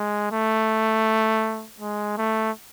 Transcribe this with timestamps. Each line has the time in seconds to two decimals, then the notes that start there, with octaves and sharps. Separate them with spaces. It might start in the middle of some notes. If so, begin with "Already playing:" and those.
Already playing: G#3
0.32 A3
1.80 G#3
2.18 A3